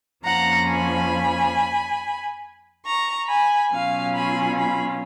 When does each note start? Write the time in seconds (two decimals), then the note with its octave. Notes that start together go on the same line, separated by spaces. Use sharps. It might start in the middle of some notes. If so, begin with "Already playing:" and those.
0.24 F2 F3 A#3 C#4 F#5 A#5
0.67 G#5 B5
2.85 A#5 C#6
3.28 G#5 B5
3.71 B2 F#3 C#4 F4 F5 G#5
4.15 G#5 B5
4.58 G#5 B5